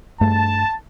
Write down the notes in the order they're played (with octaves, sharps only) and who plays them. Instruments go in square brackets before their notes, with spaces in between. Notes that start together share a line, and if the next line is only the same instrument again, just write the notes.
[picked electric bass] G2 A3 [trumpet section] A5